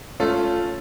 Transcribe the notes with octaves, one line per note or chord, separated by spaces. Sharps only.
A3 C#4 F4 A4